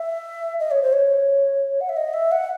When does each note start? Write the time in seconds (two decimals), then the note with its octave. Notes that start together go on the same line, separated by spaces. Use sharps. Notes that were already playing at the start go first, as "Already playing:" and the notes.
Already playing: E5
0.60 D#5
0.71 C#5
0.82 C5
0.93 C#5
1.81 F#5
1.89 E5
1.97 D#5
2.14 E5
2.32 F#5